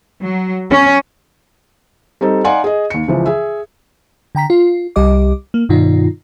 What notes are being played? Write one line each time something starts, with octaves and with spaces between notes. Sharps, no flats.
F#3
C#4
G3 C4 D#4 A4
D#4 D5 F5 F#5 G#5 C6
G#4 D#5
D#2 C#7
C#2 E3 F3
G#4 E5
D3 G5 A#5 B6
F4
C2 G3 G4 D#5 D6
A#3
G2 B2 D#3 D#4 F4